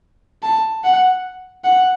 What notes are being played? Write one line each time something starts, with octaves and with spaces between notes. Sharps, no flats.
A5
F#5
F#5